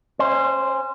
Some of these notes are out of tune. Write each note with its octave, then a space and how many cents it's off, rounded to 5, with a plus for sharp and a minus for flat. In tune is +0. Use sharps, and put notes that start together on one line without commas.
C#4 -25 C5 +0